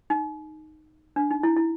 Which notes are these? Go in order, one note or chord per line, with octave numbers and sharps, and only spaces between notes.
D#4
D4
D#4
E4
E4